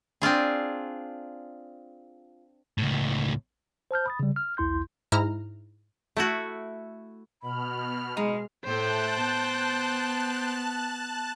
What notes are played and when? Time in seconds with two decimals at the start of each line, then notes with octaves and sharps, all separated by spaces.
0.22 C4 D4 F4 G#4
2.78 C#2 A2
3.91 C5 A5 F6 G6
4.06 B5 D#6 A6
4.20 C#3 G3
4.36 F6
4.57 B1 E2 E4 C6 G6
5.12 G#2 E4 A#5 F6
6.17 A3 E4 F#4
7.42 B2 B5 F6
8.17 G#3 D#4
8.65 A2 A3 C5 G5 A5 F#6
9.19 B3